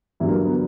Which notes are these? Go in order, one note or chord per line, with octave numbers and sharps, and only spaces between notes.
G2 D3 E3 F#3 E4
A#3
B3